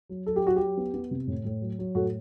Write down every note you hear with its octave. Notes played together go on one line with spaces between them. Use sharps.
F#3
F#3 A4
G4
F#3 F#4
F#3 G4
B3
B3
C3
A2
A2
F#3
F#3
A2 F#4 A4